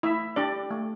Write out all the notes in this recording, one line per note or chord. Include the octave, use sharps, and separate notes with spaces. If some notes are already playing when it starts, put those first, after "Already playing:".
A3 E4 E5
D4 G4 D5
A3